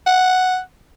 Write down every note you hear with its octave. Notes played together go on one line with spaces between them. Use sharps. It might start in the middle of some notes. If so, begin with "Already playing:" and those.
F#5